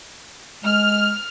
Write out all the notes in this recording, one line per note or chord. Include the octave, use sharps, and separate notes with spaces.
G#3 F6